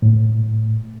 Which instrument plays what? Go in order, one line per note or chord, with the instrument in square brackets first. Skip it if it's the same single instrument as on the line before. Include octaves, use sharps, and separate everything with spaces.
[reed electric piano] A2